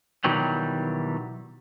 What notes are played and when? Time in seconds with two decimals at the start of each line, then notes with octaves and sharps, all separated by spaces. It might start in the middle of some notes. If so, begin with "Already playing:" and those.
0.24 B2 D#3 E3 F#3 G3